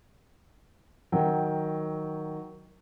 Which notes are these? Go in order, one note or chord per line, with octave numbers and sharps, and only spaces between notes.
D#3 F#3 G5